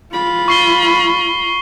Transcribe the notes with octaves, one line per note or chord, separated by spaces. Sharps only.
F4 B5
C#6 C7 G7